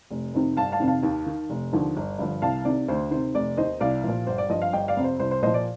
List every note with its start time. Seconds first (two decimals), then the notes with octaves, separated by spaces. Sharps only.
0.10 F1
0.34 F2 C3 D#3
0.57 G1 F5 A5
0.72 F5 A5
0.80 F2 C3 D#3
0.88 F5 A5
1.03 D#2
1.26 D#3
1.50 F1
1.73 D#2 D3 F3
1.96 G1
2.19 G2 D3 F3
2.42 C2 F5 A5
2.65 C3 D#3 D5
2.88 D2 C5
3.11 C3 D#3 C5
3.34 F1 D5
3.57 D#2 D#3 C5 D#5
3.80 C2 D5 F5
4.04 A#2 F3
4.27 G1 C5
4.38 D5
4.50 G2 F3 D#5
4.62 F5
4.73 G1 D#5 G5
4.88 D5 F5
4.97 F2 C3
5.04 C5
5.19 C2 C5
5.31 C5
5.42 A#2 F3 C5 D#5
5.54 D5